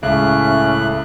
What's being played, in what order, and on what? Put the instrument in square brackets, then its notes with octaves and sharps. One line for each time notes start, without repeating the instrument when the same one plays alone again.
[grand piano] C#2 [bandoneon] A2 F#6 [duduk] C#4 [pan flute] E5